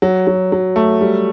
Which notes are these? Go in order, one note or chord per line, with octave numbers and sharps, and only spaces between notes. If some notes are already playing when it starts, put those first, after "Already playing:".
F#3
F#3
F#3
A3
G3